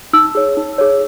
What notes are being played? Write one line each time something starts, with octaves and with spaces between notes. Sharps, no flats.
D#4 E6
G#4 C#5
D#4
G#4 C#5